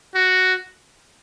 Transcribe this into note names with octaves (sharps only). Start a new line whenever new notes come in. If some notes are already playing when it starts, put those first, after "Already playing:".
F#4